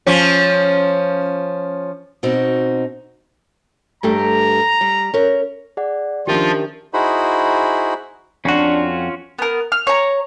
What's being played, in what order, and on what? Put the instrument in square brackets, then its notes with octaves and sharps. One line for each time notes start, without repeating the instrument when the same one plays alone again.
[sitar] F3 C#4
[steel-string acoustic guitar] B2 C4 D#4 F#4
[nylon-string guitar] G2 A3 G4 [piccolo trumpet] A#5
[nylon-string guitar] G3
C#4 A#4
[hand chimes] G#4 D5 F#5
[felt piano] D#3 C#4 D4 [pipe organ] F3 F4 [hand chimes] G4 A#4 E5
[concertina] D#4 E4 F#4 G#4 C5 B5
[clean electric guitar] F2 F#4 [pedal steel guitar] C#4 F4 [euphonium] D4
[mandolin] B3 A#4
F6
C#5 A#5